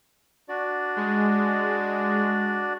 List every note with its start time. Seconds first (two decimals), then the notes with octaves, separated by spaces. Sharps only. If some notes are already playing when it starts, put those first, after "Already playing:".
0.49 D4 F#4 D5
0.96 G#3